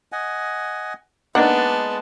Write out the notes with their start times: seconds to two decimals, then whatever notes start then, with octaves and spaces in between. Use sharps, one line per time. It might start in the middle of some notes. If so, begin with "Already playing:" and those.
0.12 D#5 F#5 G#5
1.35 G#3 A#3 B3 D4 D#4 F#5 A5